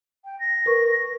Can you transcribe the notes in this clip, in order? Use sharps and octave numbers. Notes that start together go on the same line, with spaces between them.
G5
A#6
A#4 B4 C#6